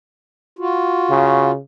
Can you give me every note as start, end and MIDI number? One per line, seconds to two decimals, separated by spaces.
0.59 1.51 65
0.59 1.51 66
1.10 1.60 49